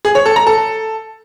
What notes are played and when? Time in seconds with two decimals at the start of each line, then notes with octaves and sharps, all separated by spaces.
0.05 G#4
0.15 C#5
0.26 A4
0.36 A#5
0.47 A4